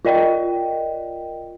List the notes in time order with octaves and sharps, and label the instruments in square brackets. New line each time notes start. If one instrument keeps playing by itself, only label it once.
[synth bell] F4 A#4 D5 D#5 G5